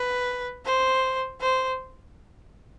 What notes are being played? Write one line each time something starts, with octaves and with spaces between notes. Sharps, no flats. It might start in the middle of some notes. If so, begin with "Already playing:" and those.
Already playing: B4
C5
C5